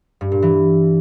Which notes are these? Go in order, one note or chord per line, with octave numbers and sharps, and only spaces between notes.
G2
A#2
E3